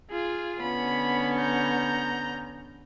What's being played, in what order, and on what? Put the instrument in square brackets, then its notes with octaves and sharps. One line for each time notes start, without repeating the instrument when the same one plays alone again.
[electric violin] F4 G#4
[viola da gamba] D3 B3 C#4 [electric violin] B5
[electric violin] A#5 G6